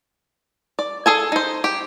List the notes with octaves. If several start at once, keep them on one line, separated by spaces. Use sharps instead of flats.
D5
G#4 A4 G#5
D#4 C5
G4